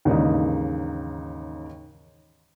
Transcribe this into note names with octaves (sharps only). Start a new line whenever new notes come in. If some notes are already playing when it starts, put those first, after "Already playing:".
D#2 G#2 C#3 E3 D4 D#4